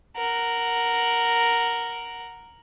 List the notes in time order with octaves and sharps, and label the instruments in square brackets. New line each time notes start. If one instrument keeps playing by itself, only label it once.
[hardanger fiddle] A#4 F#5